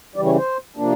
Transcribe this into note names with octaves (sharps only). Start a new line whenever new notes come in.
C#3 E3 G3 D5
C#5
C5
C3 F3 A#3 D4